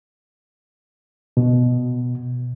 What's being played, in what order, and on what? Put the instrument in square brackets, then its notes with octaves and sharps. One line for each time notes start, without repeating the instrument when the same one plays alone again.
[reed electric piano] B2